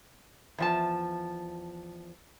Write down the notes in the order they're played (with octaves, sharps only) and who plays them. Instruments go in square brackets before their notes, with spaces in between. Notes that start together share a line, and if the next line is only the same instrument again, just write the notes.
[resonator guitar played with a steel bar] E2 F3 A5